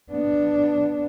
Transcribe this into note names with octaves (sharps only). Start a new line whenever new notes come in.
B3 D4